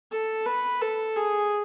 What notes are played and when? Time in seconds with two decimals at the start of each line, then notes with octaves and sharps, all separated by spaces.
0.12 A4
0.46 B4
0.82 A4
1.16 G#4